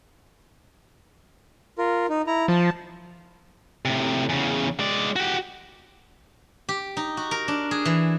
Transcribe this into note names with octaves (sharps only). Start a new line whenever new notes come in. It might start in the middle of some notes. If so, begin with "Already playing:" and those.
F4 A#4
D#4
E4 A#5
F3 A5
A2 C3
E2 C#3
G#3 D5
F#4 G4
G4
D#4
F#4
A#4
D4
G#4
E3